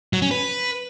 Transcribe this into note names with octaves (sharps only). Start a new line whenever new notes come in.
F#3
C#4
B4